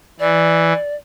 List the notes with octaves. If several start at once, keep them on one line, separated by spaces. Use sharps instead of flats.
E3 D5